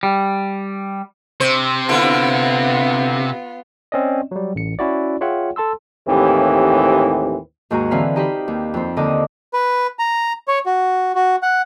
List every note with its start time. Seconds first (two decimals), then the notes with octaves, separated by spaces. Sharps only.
0.03 G3
1.40 C3 C5
1.89 D3 B3 E4 F4
3.92 C4 C#4 D5 D#5
4.31 F#3 G3
4.55 A1 C#7
4.79 C#4 E4 F#4 D5
5.21 F4 G#4 C#5 E5 F#5 G5
5.56 A4 A5 C6 E6
6.07 D#2 A2 E3 C4 G4
7.71 D#2 G#2 F#4 G#5 A#5
7.91 D3 E3 C4 F5 B5 F6
8.16 D#4 G4 F5 B5
8.48 D#2
8.74 F2 C4
8.96 D#2 D3 D#4 D#5 D6
9.53 B4
9.99 A#5
10.48 C#5
10.66 F#4
11.15 F#4
11.43 F#5